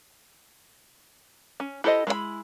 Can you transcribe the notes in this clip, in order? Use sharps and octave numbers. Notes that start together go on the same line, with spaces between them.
C#4
E4 G4 A4 C5 D#5
G#3 E4 C5 B5